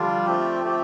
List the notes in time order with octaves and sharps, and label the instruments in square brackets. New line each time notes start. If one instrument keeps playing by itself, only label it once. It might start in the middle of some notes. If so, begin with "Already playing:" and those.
Already playing: [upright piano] D3 F3 [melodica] G3 D4 F4
[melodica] A3 C4 G4
A3 C4 G4